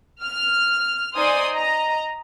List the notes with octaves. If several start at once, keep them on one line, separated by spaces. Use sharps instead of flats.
F6
D#4 C5 D5 G#5 C6 D#6
D#5 A#5